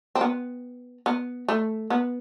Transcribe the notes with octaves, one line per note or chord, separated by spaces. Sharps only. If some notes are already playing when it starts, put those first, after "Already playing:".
C4
B3
B3
A3
B3